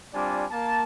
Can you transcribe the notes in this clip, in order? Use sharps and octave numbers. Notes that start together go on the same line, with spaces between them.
G3 C4 D4 F4 D5 G#5
A#3 A5